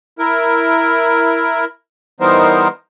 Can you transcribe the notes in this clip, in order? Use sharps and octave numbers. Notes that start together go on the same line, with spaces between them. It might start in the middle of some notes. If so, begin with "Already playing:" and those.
E4 A#4
E3 G3 B3 D#4 A#4 C5